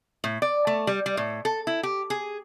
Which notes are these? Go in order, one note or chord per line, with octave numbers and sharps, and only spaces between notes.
A2
D5
A3
G3
G3
A2
A4
E4
G4
G#4